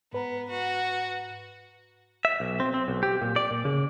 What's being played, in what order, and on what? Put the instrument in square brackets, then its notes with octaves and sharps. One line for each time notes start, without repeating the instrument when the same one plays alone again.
[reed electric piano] G#2 B4 A#5 [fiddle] B3
[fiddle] F#4
[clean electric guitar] E5
B1
C4
C4
B1
G4
A#2
D5
A#2
C#3